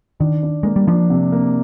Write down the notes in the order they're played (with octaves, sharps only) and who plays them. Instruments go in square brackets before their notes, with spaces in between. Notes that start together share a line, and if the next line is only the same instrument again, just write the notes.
[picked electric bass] D#3 [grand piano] D4
[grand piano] D4
[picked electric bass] G#3 [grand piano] A#3
[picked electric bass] G3
[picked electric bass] F3 [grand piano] D4
[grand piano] C3
A#3